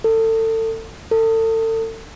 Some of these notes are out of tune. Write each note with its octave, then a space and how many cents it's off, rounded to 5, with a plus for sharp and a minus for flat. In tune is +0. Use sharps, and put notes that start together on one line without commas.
A4 +30
A4 +35